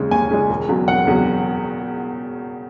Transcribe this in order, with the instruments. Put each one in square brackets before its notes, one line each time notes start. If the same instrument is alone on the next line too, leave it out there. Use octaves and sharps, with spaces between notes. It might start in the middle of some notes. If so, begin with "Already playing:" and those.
Already playing: [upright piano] D#2 C#3 G#3
D#2 G#5
C#3 G#3
E1
E2 C#3 F#3
E1 F#5
E2 C#3 F#3